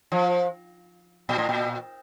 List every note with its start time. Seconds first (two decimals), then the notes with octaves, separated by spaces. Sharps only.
0.12 F3
1.29 A#2
1.38 A2
1.49 A#2